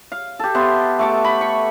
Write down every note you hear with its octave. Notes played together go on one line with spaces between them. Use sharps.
F5
G4 A4
B3 E5 C6
A3 C#6 D6
B5
C#6